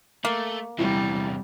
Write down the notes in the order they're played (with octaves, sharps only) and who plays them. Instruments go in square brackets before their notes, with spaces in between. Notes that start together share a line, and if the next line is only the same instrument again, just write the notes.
[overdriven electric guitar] A3 [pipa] A#3
[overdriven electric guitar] E2 C3 [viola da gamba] G3 [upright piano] E4